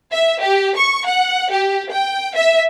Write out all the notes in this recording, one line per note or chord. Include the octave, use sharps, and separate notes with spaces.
E5
G4
C#6
F#5
G4
G5
E5